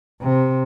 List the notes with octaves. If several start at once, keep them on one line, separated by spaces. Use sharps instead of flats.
C3